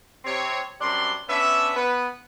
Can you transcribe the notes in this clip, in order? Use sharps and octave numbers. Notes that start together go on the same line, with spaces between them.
C3 C4 C#5
F#2 C3 G3 D4 C6
B3 C#4 D4 E5
B3 B4